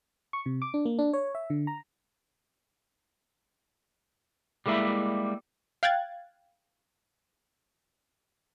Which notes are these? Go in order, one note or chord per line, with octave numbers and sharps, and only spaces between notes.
C#6
C3
D6
D4
A#3
D4
C#5
E5
D3
A#5
G3 G#3 A#3 E4 E5 B5
F5 G5 F#6 G#6 A6